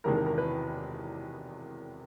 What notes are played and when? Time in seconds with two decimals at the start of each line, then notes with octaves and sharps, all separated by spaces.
0.04 E1 E2 C3 D#3 G#3 A#4
0.15 A#4
0.26 A#4
0.38 B4